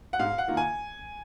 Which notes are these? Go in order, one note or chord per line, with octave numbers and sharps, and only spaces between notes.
F#5
G#2 F5
F#5
D#3 A#3 F4
G#5